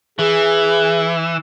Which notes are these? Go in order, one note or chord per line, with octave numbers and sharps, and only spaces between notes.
E3 G#4